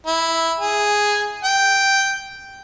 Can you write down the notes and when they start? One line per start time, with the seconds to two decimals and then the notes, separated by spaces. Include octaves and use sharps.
0.07 E4
0.60 G#4
1.44 G5